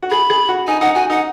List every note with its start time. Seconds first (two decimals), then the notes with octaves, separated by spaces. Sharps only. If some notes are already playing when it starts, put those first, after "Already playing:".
0.03 F#4
0.10 G#4 B5
0.30 G#4
0.49 F#4
0.67 D#4 G#5
0.81 D#4 F#5
0.95 F#4 G#5
1.10 D#4 F#5